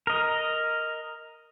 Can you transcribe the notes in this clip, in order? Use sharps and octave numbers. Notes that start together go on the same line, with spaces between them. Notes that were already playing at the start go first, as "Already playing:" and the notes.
A#4 D#5